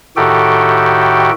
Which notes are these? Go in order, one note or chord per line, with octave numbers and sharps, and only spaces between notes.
A2 D#3 F#4 G4 A4 G5